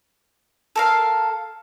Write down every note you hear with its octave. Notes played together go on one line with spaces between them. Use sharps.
A4 A#4 F5